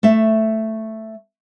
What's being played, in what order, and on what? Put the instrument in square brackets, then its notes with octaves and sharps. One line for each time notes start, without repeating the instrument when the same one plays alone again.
[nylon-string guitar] A3 E5